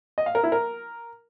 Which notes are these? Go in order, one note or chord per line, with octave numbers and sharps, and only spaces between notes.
D#5
F5
A#4
E4
A#4